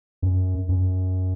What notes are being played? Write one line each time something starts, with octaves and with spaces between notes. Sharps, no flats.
F#2
F#2